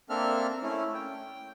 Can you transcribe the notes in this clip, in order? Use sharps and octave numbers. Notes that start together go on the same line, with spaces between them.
A#3 C4 D4 A4 E5 F6
A3 C#4 E4
G5